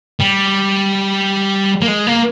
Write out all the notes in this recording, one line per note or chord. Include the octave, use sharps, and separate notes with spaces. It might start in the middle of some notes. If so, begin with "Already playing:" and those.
G3
A#3
G#3
A#3